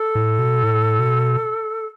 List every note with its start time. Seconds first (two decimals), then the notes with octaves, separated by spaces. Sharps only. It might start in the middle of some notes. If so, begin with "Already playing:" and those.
Already playing: A4
0.15 A2
0.39 B2
0.63 A2
0.99 B2